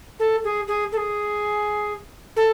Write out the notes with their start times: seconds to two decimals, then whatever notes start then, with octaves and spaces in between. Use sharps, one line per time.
0.19 A4
0.44 G#4
0.68 G#4
0.92 A4
0.97 G#4
2.36 A4